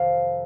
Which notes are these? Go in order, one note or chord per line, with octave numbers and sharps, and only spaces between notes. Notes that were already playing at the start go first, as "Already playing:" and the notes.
Already playing: F2 C3 D#3 F5